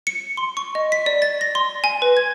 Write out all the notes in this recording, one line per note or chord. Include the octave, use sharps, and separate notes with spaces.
C#7
C6
C#6
D#5
B6
D5
A6
A#6
C6
G#5
B4
G#6